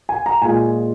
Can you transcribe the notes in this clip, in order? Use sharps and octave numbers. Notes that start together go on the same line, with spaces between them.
G#5
A#5
A#2 G#3 F4 G#5